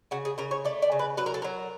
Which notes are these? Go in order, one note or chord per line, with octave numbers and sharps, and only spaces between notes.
C#3 F#4
G#4
C#3 A#4
C#5
A3 D5
D5
C#3
B4
F#3 B4
A#4
A4
F#3 A#4